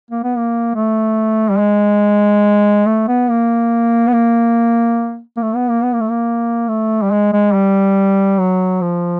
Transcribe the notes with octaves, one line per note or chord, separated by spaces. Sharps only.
A#3
B3
A#3
A3
G3
G#3
A3
B3
A#3
B3
A#3
A#3
A3
B3
A#3
B3
A#3
A3
A#3
A3
G3
G#3
G#3
G3
F#3
F3